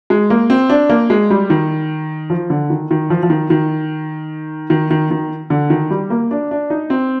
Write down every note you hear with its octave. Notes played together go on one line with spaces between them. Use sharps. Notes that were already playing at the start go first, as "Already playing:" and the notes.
G#3
A#3
C4
D4
A#3
G#3
G3
D#3
F3
D3
D#3
D#3
F3
F3
D#3
D#3
D#3
D#3
D#3
D3
D#3
G3
A#3
D4
D4
D#4
C4